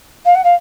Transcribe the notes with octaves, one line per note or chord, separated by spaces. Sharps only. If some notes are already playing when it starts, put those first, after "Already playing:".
F5
F#5
F5